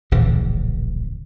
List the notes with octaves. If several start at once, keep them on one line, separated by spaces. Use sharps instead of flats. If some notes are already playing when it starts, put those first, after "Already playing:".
D1 A#1 C#3 E3